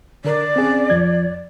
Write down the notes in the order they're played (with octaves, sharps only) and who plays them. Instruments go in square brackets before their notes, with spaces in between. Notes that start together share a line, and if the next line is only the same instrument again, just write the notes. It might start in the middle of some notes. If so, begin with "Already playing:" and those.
[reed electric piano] D3 A#4 [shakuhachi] D5
[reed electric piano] C4 C#4 G#4
F2 F3 G#6